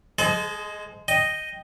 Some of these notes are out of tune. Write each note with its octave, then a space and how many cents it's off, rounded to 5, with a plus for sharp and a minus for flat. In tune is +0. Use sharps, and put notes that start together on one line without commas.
G#3 +0 A4 -45 C5 -25
D#5 +0 G5 +0